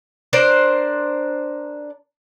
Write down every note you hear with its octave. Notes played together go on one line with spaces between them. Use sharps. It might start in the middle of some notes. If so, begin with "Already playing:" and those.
D4 A#4 C5